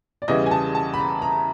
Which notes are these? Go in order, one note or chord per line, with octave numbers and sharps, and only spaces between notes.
D5
E2 C#3 E3 G3 D#5
G#5
A5
A5
B5
A#5
A#5